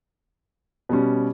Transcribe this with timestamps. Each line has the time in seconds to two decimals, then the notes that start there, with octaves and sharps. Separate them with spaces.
0.89 B2 G3 C#4